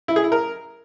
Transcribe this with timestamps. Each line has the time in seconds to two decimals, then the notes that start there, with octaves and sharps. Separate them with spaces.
0.08 E4
0.16 G#4
0.24 E4
0.32 A#4